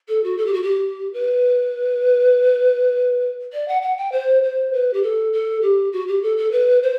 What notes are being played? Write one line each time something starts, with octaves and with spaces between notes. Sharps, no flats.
A4
F#4
A4
G4
F#4
G4
B4
D5
F#5
F#5
G5
C5
C5
B4
G4
A4
A4
G4
F#4
G4
A4
A4
B4
C5